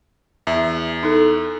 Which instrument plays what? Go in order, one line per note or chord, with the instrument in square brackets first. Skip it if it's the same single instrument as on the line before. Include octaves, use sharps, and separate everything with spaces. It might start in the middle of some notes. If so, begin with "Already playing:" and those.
[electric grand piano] E2 [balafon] E5
[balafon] D#4 A4